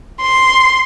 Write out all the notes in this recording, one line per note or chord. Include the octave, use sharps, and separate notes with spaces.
C6